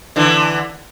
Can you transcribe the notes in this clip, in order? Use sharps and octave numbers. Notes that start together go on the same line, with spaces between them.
D3 E3